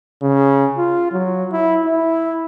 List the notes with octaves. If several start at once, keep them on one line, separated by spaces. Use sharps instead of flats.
C#3
F4
F#3
E4
E4